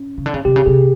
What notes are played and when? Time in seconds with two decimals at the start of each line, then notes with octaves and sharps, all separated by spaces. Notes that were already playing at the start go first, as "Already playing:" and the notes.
Already playing: C#4
0.17 C#3
0.26 D3
0.34 C#3
0.45 C3 G4
0.56 C#3
0.66 C3 G#4